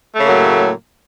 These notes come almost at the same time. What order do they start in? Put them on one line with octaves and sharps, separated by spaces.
A3 C#3 A#3 F#3 A2